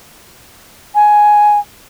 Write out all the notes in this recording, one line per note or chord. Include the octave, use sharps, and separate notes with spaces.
G#5